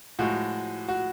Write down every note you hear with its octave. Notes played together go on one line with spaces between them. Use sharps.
A2 F3 G#3 F#4
F#4